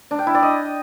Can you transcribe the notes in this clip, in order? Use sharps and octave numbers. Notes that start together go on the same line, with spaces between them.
D4
G5
E4
D5
D#5